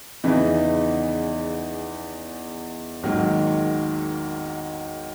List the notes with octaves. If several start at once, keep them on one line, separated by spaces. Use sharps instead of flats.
E2 C#3 E3 B3 D#4
G#1 G#2 D#3 F#3 A#3